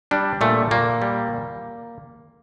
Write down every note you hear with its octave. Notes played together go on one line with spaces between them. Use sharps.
G3 D4
A#2 A3
A#2 A#3
G3